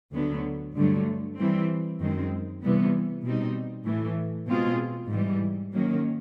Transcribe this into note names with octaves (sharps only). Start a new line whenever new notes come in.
D2 D3 F#3 B3
G2 D3 F#3 A3
E3 G3 C4
F#2 D#3 G#3 C4
C3 E3 G3 B3
B2 G3 C4 D#4
A2 E3 A3
B2 G#3 C4 F4 G#4
G#2 E3 G3
D#3 F#3 A#3 C#4